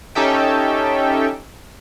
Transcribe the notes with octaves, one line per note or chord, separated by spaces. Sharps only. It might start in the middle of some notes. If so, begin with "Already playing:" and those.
C#4 D#4 G4 A4 E5 G5